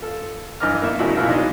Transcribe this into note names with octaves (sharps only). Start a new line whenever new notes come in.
F4 A4
G2 E3 D#5 D6 F6
A#3 B3 E5
A2 C#3 F#3 G#3 E4 F#4
B2 E3 B3 E4 F4 A#4
F#3 G#3 D4 D#4